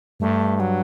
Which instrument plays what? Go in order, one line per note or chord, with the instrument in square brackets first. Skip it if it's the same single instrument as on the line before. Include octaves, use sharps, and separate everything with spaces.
[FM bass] G2 [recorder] A3
[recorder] A3
F#3